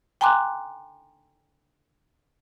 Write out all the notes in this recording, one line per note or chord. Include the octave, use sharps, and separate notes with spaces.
G5 G#5 A#5 C6 D6 F#6